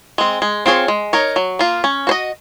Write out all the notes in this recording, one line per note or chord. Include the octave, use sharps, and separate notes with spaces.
G#3 C4
G#3
C4 F4 G#4 C#5
G#3
D#4 A#4 C#5
F#3
A#3 F4
C#4
F#4 C5 D#5